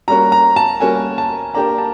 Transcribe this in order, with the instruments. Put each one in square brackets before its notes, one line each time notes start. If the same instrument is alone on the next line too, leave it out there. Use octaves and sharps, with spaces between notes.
[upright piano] G3 A#3 C#4 F#4 A#4 [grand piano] A#5
[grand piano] A#5
A5
[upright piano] G3 A#3 C#4 F#4 A#4 [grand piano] G#5
[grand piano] A5
[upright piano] A#3 D4 G4 A#4 [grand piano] A#5
[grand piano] A5